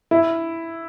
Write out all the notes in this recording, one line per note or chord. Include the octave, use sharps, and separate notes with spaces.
E4